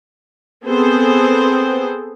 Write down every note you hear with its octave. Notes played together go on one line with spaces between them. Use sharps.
B3 C4 G#4 A4 C5